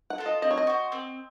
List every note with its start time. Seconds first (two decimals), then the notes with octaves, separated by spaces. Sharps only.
0.10 F#5
0.18 F4 A4
0.26 D#5
0.42 C4 D#5
0.51 C#5
0.58 D#5
0.67 F#4 C5
0.92 C4